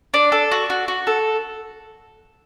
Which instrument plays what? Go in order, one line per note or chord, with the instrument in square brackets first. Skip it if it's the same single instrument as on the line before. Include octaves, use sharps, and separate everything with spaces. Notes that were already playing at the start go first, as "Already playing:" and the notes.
[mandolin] D4 D5
A4
F#4
F#4
F#4
A4